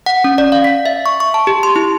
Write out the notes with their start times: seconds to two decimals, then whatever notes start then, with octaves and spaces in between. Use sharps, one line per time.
0.06 F#5
0.24 C#4
0.38 D5
0.52 F5
0.64 B6
0.86 E5
1.06 C#6
1.20 C#6
1.34 A5
1.47 G4
1.63 C6
1.76 E4